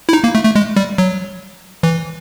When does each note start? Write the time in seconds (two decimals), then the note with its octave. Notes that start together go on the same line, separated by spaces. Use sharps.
0.09 E4
0.13 D#4
0.24 A#3
0.35 A3
0.45 A3
0.56 G#3
0.76 G3
0.98 F#3
1.83 E3